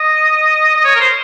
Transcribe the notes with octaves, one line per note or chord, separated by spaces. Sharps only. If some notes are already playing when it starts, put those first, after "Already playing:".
Already playing: D#5
D#5
C#5
A#4
C5